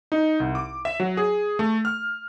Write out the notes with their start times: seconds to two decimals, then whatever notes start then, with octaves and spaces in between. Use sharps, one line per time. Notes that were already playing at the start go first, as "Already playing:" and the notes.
0.12 D#4
0.40 C2
0.55 D6
0.85 E5
1.00 F#3
1.17 G#4
1.59 A3
1.85 F6